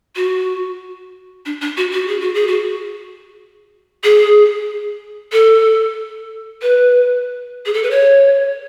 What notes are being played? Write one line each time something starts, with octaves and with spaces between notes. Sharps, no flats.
F#4
D4
D4
F#4
F#4
G#4
F#4
G#4
F#4
G#4
A4
B4
G#4
A4
B4
C#5